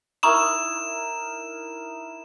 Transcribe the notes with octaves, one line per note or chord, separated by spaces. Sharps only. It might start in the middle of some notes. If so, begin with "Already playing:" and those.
D#4 E4 A#4 A#5 C#6 D#6 E7